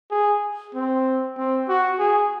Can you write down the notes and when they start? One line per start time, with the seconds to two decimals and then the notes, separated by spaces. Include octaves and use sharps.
0.11 G#4
0.75 C4
1.37 C4
1.69 F#4
1.99 G#4